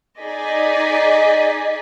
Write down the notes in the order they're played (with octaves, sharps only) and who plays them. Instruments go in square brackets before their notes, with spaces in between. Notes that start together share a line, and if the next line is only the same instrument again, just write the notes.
[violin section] D#4 G#4 D5 D#5 B6